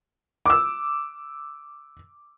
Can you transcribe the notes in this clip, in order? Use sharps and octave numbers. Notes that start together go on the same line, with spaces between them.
D6 E6